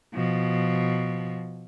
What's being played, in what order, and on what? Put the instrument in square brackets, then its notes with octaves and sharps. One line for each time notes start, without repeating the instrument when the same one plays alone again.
[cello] B2 F3